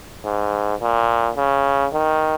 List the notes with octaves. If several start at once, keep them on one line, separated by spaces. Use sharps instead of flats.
G#2
A#2
C#3
D#3